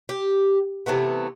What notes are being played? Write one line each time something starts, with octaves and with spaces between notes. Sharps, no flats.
G4
C3 E3 A3 B3